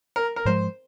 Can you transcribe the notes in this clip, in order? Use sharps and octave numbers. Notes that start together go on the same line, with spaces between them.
A#4
A#4
G#2 F3 G#3 C5